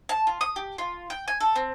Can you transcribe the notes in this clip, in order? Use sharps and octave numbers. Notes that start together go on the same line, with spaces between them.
A5
F4
D#6
G4
F4
G5
G#5
A4
C4